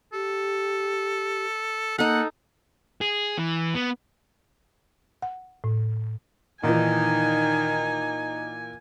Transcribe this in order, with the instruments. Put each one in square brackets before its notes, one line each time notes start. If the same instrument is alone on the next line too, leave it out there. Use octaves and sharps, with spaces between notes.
[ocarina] G4 [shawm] A4
[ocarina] A#3 [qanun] D#4 A4 [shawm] F#5
[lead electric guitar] G#4
E3
B3
[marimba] F#5
A2
[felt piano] A#2 E3 [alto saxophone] D#3 [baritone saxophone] D#4 [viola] G#5